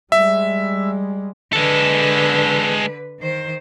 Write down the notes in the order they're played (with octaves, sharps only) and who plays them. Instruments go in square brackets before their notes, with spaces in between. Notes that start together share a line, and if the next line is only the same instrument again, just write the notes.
[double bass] G3 G#3 [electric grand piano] E5
[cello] D3 B4 [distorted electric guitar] G#3 A4
[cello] D#3 C5